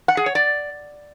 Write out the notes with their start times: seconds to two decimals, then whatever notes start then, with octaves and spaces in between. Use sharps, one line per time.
0.08 F#5
0.17 G#4
0.26 C#5
0.35 D5